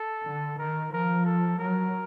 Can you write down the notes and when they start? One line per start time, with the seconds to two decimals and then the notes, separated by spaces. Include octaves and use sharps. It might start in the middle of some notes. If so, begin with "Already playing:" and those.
Already playing: A4
0.26 D3
0.58 D#3 A#4
0.92 F3 A#4
1.26 A4
1.58 F#3 A#4